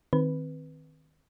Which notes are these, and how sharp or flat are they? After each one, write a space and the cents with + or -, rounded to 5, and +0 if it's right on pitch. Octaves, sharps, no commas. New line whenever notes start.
D#3 +0 C4 +0 B4 +0